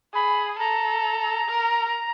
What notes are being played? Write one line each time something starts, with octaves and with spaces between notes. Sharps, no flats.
G#4 B5
A4 A#5
A#4